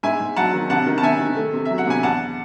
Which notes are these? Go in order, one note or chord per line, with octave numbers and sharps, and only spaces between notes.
G#2 E5 G#5
G#2
F#3 F#5 A5
D#3
C3 F#5 A5
D#3
A5
C3 E5 G#5
D#3
A3
C3
F#3 E5
F#5
C3 G#5
E2 F#5 A5